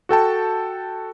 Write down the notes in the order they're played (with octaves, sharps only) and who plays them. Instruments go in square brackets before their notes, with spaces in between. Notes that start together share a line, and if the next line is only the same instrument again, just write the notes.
[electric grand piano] F#4 A4 G5 A5